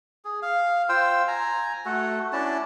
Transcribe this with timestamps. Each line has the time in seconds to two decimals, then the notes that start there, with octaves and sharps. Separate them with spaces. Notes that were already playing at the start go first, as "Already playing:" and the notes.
0.25 G#4
0.42 F5
0.89 F4 C5 G5 E6
1.28 G#5 A#5
1.86 A3 F#4 A4
2.33 C#4 D4 E4 A5